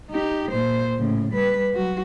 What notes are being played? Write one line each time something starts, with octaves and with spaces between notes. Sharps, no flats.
D#4 G4
A#2 C5
A2 C#3
G3 B4
F#3 F#4